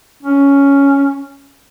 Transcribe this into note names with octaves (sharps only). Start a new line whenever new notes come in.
C#4